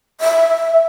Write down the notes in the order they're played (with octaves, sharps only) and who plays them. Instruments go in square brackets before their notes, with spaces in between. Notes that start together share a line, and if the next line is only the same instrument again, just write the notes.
[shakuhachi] E5